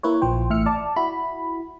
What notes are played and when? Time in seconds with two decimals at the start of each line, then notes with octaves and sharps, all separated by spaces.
0.03 A#3 E4 B4 C#5
0.22 A#1 F3 C5 G5
0.50 A1 A2 E5 F6 C#7
0.66 D5 A5
0.96 E4 F#4 B5